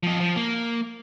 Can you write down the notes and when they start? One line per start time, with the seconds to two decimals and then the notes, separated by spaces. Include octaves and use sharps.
0.03 F3 D#5
0.20 F3
0.36 A#3